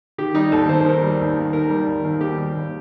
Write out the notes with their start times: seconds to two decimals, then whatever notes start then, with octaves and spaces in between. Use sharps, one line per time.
0.18 D#3 G4
0.35 G3 D#4
0.52 D#2 A4
0.69 D#2 C5
0.80 C5
0.85 D#3 A#4
1.03 G3
1.20 D#2
1.36 D#2
1.53 D#3 A#4
1.70 G3
1.87 D#2
2.05 D#2
2.21 D#3 G4
2.38 G3
2.55 D#2